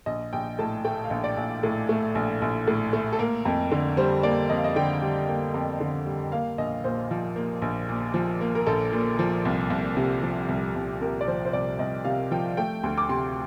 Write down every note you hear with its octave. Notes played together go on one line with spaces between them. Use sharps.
A#1 D#5
A#1 G5
A2 A5
A3 G5
F5
A#1
D5
A#1
A2
A3
A#1
A#1
A2
A3
A4
A#3 A#4
F2
D3
G3 C5
A#3 D5
F2 D#5
F5
D#5
D3 G5
G3
A#3
F2
D3
G3
A#3 F5
A#1 D#5
A#2 C5
F3
A#3
A#1
A#2
F3
A#3
A#4
A#1 A4
A#2
F3
C2
C2
C3
F3
C2
C2
C3 A#4
D5
F3 C5
C5
C2 D5
C2 D#5
C3 F5
F3 G5
A3 G5
D2
D6
C3 C6